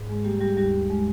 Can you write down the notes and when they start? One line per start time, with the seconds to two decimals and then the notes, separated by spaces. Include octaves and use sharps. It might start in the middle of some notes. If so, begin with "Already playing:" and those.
Already playing: G#2
0.09 G#3 G#4
0.24 G3 A#3 G4
0.41 G3 G4
0.57 D#2 G3 G4
0.90 G#3